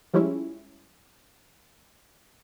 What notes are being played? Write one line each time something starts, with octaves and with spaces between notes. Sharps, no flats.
F3 G3 G#3 C#4 E4